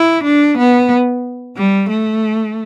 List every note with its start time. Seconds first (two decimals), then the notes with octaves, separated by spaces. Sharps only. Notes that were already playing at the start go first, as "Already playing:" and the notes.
Already playing: E4
0.24 D4
0.58 B3
1.57 G3
1.90 A3